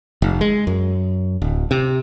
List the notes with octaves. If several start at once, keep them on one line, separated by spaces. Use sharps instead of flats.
F1
G#3
F#2
D1
C3